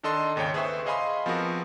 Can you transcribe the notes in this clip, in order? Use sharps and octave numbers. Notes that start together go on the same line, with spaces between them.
D#3 D4 A4 D#5 C6
G#1 D#2 C#3 C#5 G5
G#4 B4 C5 E5 C#6
G#4 D#5 F5 G#5 B5 C6
F3 B3 C4 F#4 A#4